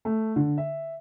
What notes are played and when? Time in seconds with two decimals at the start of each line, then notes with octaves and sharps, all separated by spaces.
0.05 A3
0.36 D3
0.58 E5